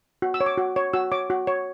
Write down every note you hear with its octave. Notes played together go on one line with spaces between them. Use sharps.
F#4
E6
C#5
D6
F#4
C#5
F#4 E6
C#5 D6
F#4
C#5